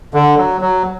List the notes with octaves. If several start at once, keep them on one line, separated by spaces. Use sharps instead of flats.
D3
F#3
F#3